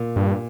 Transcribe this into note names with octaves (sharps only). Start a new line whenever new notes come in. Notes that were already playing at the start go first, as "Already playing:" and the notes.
Already playing: A#2
G2